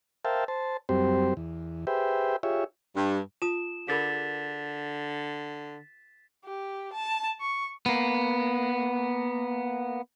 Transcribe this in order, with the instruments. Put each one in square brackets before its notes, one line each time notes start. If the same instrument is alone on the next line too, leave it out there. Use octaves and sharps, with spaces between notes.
[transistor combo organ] A#4 C5 E5 F5 G5 A5
C5 A5
F#2 G3 C4 G4 C5
E2
G4 G#4 B4 C5 E5 G5
F4 G4 G#4 C#5 E5
[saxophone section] G2
[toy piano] F4 A5 D#6 [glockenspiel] E7
[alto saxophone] D3 [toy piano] G#4 A#4 B5 [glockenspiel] A6 B6
[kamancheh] G4
A5
C#6
[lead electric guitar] A#3 B3